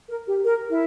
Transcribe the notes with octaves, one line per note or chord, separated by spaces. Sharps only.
A#4
G4
A#4
E4